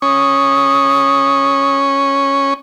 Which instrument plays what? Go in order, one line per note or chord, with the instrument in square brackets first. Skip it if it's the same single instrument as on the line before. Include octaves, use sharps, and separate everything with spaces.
[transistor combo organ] C#4 [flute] D#6